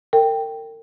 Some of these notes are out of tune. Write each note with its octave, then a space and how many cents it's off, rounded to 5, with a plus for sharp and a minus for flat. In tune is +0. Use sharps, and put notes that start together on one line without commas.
A#4 -40 G5 +0